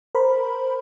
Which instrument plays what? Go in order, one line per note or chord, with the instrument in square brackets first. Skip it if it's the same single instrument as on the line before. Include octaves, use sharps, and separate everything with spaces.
[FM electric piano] A#4 C5 B5